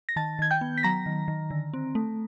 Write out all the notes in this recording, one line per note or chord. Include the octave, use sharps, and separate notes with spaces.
A#6
D#3 A5 A6
D#3 G#6
G5 G6
B3
B6
F#3 A#5 A#6
D#3
D#3
D3
C4
A3